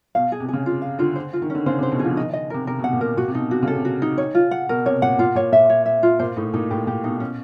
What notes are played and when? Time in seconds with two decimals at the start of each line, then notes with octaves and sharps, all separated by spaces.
0.15 B2 F5
0.32 G#4
0.40 C3
0.49 C#3 G#4
0.66 F4
0.82 F5
0.99 D3 F4
1.16 C5
1.33 F4
1.42 D#3
1.50 D3 C#4
1.66 C#3 C5
1.79 C3
1.83 C5
1.92 B2
1.99 G#4
2.05 F3
2.17 D#3 D#5
2.33 D#5
2.50 C3 A#4
2.67 C3 A#4
2.79 B2
2.84 F#5
2.93 A#2
3.01 A#4
3.17 A#2 F#4
3.28 C3
3.35 B2 D#4
3.51 C3 F#4
3.63 C#3 A4
3.75 C3
3.85 F#4
4.02 D#4
4.18 C#5
4.35 F4
4.51 F#5
4.69 B2 A#4
4.86 C3 C#5
5.02 A#2 F#5
5.19 A#2 F4
5.35 A#2 C#5
5.52 A#2 E5
5.69 C#5
5.86 E5
6.03 F4
6.19 A#2 C5
6.37 A2 D#4
6.54 A#2 D#4
6.71 A2 G4
6.87 A#2 G4
7.04 B2 D#4
7.20 B2 C#4